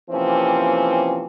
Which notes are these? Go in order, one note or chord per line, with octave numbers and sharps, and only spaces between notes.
C3 E3 F3 A#3 C4 C#4